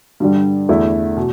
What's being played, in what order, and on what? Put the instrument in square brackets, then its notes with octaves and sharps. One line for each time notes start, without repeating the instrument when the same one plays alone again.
[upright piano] G2 D3 G3
E2 D3 A3 E4
B2